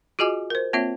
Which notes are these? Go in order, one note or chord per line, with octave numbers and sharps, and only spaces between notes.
F4 F#4 G#4 D#5 G#5 D6
A#4 C5
A#3 C4 F4 C#5 E5